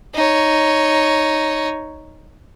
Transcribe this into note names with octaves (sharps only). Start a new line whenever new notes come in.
D#4 C#5